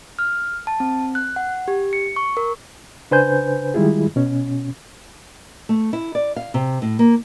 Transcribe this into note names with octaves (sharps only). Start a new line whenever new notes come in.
F6
A5
C4
F#6
F#5
G4
C#7
C#6
A#4
C#3 D4 B4 C5 G#5 G6
D#3 G3 G#3 E4 F4 G#4
B2 C#4
A3
E4
D5
F5
C3
A2
A#3